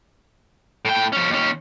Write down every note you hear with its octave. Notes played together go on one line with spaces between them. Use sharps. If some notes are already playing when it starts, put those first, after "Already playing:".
A2 G5
F3 C#4
D#2 C#4